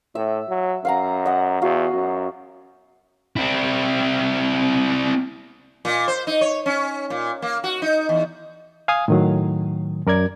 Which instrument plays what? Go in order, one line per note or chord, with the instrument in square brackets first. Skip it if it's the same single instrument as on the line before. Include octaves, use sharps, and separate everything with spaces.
[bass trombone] A2 [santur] E5
[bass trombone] F#3
[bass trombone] F#2 [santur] F5 F#5 A#5
[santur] D#5 F#5
[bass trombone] E2 [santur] F#4 F5
[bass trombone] F#2
[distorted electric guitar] C4 E4
[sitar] A#2
C5
D#4
C#5
C#4
A#2
A#3
F#4
D#4
E2
[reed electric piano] F5 G#5 D#6
A2 D#3 F#3
F#2 A#4 D5 G#6